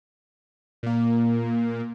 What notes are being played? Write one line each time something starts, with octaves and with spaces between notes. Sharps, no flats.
A#2 A#3